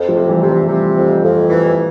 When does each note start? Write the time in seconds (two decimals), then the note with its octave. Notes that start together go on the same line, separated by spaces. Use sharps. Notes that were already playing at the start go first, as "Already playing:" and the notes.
Already playing: F2
0.08 F3 A3
0.16 C3
0.29 E3 G3
0.42 C3
0.49 E3 G3
0.69 C3
0.96 F2
1.23 F2
1.49 E3